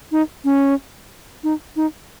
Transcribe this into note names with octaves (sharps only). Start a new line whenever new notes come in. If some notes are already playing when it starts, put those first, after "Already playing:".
D#4
C#4
D#4
D#4